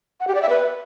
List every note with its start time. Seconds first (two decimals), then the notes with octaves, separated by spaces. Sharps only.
0.20 F#5
0.28 G4
0.35 D5
0.42 E5
0.49 B4